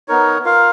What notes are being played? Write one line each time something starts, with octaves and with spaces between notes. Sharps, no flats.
B3 D#4 A#4 C#5
F4 A#4 F5